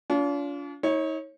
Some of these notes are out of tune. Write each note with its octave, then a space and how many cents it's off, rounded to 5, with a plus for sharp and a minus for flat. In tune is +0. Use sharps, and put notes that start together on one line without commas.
D4 -45 F4 +0
D#4 +40 C#5 -15